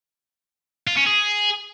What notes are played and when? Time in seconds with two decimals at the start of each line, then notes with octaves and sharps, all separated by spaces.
0.87 F4
0.97 C#4
1.06 G#4